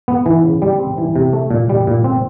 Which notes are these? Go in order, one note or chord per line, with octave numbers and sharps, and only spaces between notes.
B3
E3
C#3
G3
C4
E3
C3
A3
A#2
G3
A#2
C4